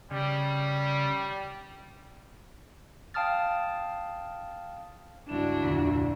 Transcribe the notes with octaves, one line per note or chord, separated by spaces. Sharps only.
C#3 G3
F5 G5 A5 D#6 F6 A6
C#2 G2 D4 E4 F#4 E7
F1 D2 A#2 B6